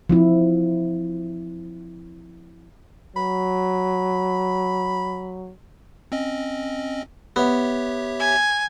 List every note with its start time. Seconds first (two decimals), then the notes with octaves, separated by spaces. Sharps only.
0.10 F3 C4 E4
3.16 F#3 B5
6.12 C4 C#4 D#5
7.36 B3 G4 C#5 E5
8.20 G#5